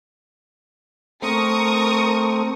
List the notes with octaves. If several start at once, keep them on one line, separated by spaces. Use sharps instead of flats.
A3 C4 A#4 C#6 D#6